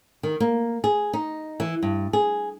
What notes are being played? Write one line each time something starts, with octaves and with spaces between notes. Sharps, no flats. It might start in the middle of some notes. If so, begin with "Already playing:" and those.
D#3
A#3
G#4
D#4
E3
G2
G#4